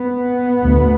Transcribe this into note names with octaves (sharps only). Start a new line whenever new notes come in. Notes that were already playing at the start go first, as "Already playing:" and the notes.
Already playing: B3
D2